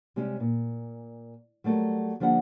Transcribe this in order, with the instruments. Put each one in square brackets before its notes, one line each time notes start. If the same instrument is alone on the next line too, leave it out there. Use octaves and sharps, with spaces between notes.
[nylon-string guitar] C3 G3 G#3 C#4 G#4
A#2
F#3 G3 A3 A4 A#4
D3 F3 G3 A#3 F#5